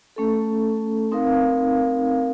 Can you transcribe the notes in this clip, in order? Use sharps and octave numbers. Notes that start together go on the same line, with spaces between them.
A3 C#4 A4
C4 D#4 A#4 F5